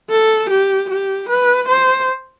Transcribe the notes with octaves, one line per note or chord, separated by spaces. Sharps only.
A4
G4
G4
B4
C5